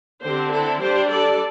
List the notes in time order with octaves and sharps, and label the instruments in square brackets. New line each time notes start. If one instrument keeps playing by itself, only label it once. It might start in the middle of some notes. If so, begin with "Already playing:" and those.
[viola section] D3 C4 G4 C5
E4 A4
G3 D4 G4 C5
A4 D5